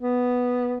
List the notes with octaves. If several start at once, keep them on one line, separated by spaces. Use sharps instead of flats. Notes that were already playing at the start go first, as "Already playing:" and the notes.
B3